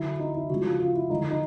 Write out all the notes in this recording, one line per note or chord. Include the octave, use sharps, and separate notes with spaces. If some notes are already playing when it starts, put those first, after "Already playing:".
Already playing: D3 F#3 E4
D#4
E4
C#3 F3 G#3 F#4
F4
F4
E4
D3 F3 G#3 D#4
D#4